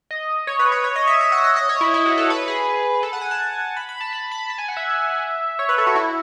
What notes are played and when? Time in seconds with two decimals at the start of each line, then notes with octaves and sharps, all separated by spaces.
0.11 D#5
0.47 C#5
0.59 B4
0.72 B4
0.84 C#5
0.96 D#5
1.07 E5
1.21 E5
1.32 F#5
1.44 D#5
1.56 D#5
1.69 C#5
1.81 E4
1.94 E4
2.06 F#4
2.18 A4
2.30 B4
2.48 G#4
3.03 A4
3.13 F#5
3.21 G#5
3.31 A5
3.77 B5
3.89 B5
4.00 A5
4.13 B5
4.32 B5
4.50 A5
4.58 G#5
4.68 F#5
4.77 E5
5.59 C#5
5.69 B4
5.78 A4
5.87 F#4
5.95 E4